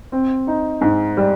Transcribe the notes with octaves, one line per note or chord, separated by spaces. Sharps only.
C4
D#4
G#2
G3